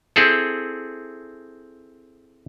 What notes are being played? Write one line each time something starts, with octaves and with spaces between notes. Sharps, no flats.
C4 E4 G#4 A4